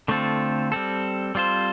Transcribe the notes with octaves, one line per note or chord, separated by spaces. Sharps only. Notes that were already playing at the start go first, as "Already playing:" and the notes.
D3 A3 C4 F4 A4
G3 C4 A4
G3 C4 F4 A4 C5